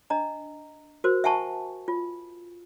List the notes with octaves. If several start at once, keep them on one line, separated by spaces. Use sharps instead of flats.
D4 D#5 A#5
F#4 A#4 C5
E5 F#5 G#5 A5 C#6
F4